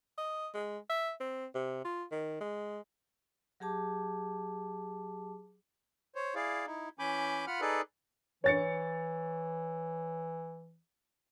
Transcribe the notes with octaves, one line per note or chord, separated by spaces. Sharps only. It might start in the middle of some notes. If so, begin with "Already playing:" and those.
D#5
G#3
E5
C4
C3
F4
D#3
G#3
F#3 G4 G#4 A5 D6
C5 C#5
E4 G#4 D5 F5
D#4 E4
E3 C#4 G#5 B5 D6 G6
F4 F#5 B5 F6
D#4 G#4 A4 B4 D5
E3 C#5 A6 C#7